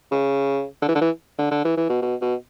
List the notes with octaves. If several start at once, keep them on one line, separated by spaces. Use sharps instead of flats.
C#3
D3
E3
D3
E3
D3
D3
E3
E3
B2
B2
B2